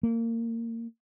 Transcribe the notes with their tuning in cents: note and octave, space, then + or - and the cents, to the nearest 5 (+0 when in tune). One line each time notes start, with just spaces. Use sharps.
A#3 -25